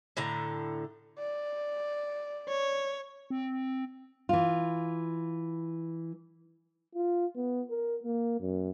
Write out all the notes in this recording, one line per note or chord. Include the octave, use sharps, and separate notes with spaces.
A2 D3 A#5
D5
C#5
C4
E3 F4
F4
B3
A#4
A#3
F#2